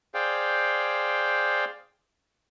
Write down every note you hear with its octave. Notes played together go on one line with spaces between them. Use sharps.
G#4 C5 D5 F5 G5